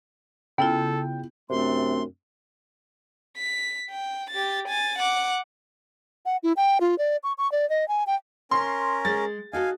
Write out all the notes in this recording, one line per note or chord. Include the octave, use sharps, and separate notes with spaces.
C#3 B3 E4 F4 A4 G5
F#2 C3 A3 C4 D4 C6
B6
G5
G4 A6
G#5 A6
F#5 D6
F#5
E4
G5
F4
D5
C#6
C#6
D5
D#5
G#5
G5
C#4 A#4 C6
G#3 A6
D#4 F#4 A4 F5 G#5